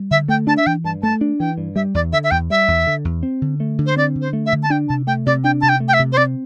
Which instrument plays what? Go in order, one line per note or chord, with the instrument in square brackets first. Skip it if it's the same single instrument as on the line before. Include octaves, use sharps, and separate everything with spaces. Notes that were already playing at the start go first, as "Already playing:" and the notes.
Already playing: [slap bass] G3
[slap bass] D3 [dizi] E5
[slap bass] A3 [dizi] G5
[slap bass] D4 [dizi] A5
[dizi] E5
[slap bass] E3 [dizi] G5
[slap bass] G2 [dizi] A5
[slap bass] A3 [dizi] A5
[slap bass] D4
[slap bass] E3 [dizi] G5
[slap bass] G2
[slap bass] G3 [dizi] E5
[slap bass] E2 [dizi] D5
[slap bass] D3 [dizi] E5
[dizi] E5
[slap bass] E2 [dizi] G5
[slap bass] G3 [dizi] E5
[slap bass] E2
D3
E2
C4
D3
A3
D3
[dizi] C5
[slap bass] C4 [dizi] D5
[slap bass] D3
[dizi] C5
[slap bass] A3
[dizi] E5
[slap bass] D3
[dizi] A5
[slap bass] D4 [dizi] G5
[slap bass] C3 [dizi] A5
[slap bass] A3 [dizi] G5
[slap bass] C3 [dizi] D5
[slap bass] D4 [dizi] G5
[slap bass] C3 [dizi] A5
[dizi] G5
[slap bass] A3
[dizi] G5
E5
[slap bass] C3
[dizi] C5
[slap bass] C4 [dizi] D5